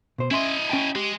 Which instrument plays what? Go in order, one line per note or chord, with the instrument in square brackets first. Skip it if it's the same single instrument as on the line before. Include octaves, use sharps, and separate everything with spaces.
[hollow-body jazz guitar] B2 C5
[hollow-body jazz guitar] C#4 E5 C6 [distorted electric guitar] E4 D#5
[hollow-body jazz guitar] C#4 G5 A5
[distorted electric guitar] G#3 [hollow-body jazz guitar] G4